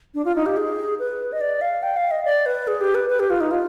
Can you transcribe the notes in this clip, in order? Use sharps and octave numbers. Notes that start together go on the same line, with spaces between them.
D4
F4
D#4
G4
G#4
B4
D#5
D5
F5
G5
F5
D#5
D5
B4
G#4
G4
B4
B4
G4
F4
D#4
F4